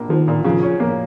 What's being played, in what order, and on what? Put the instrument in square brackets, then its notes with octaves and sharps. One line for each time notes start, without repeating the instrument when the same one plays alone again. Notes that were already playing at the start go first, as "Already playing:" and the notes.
Already playing: [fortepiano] A#1 A#3
[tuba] D#3 [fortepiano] F3
[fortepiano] A#2
[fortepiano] C#3 [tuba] F3
[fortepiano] C#4
A#3